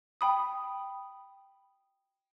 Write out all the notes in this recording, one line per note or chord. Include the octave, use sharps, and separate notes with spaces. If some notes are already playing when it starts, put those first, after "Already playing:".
G5 B5 D#6